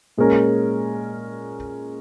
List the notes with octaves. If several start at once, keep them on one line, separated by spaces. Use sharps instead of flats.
A#2 G#3 C#4 A#4